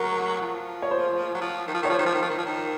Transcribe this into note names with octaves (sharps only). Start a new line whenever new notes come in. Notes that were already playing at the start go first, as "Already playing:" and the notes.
Already playing: F#3 A#4
F3
C#5
C5
F#3
F3
D#3
F3
D#3 C#5
F3 C5
D#3
F3
D#3
F3
D#3
F3
D#3